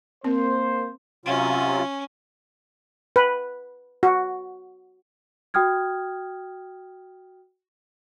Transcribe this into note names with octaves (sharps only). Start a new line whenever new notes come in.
A#3 C4 C5
C3 F#3 C#4 F4
B4
F#4
F#4 G5 D#6 F6 G#6